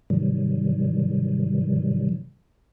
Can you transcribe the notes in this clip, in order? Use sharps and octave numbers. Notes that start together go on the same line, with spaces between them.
G#2 C3 D#3 E3 F#3 G3